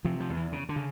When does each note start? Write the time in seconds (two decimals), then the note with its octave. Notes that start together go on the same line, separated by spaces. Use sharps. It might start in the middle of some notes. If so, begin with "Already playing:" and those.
0.04 C3 F3
0.20 F3
0.29 E2
0.37 E3
0.52 C#3
0.69 D3
0.76 C#3